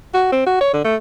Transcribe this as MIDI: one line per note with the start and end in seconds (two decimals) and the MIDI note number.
0.14 0.29 66
0.33 0.42 60
0.47 0.57 66
0.61 0.69 73
0.73 0.81 50
0.85 0.96 57